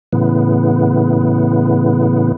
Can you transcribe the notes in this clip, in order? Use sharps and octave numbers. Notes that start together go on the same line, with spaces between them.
A2 C#3 E3 B3